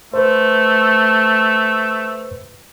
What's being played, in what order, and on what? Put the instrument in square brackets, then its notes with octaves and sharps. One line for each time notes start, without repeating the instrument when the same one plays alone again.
[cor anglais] A3 [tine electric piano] B4 C5